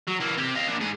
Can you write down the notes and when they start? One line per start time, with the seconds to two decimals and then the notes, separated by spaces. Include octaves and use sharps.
0.08 F#3
0.21 E3 A#3
0.38 C4 G4
0.56 D#5 F5
0.69 A#2 D4
0.80 G#2 G#4